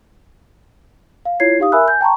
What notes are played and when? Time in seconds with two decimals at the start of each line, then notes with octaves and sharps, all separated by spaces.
1.25 F5
1.40 E4 F4 C#5 G#6 C7
1.59 D#4 G4 F5 D#6
1.72 A#4 E5 G#5 B5 E6 F#6
1.88 G#5 G6
2.01 G5 A5 A#5 C6 C#6